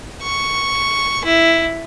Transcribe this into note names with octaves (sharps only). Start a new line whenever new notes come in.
C#6
E4